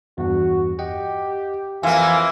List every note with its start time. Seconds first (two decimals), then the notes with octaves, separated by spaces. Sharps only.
0.18 E2 G2 F#4
0.79 G4 D#5 F#5 G5
1.83 F2 E3 A#3 F5 F#5 G#5 C6